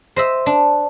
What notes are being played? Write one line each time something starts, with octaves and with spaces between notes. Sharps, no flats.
C5 D#5 E5
D4